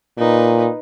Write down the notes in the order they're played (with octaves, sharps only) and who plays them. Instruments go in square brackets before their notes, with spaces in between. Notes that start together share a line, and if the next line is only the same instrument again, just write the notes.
[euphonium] A#2 [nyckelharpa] D#4 B4